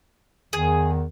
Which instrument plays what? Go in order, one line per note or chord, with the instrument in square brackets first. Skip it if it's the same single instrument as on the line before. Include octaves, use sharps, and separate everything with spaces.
[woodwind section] E2 D#3 [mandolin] G#4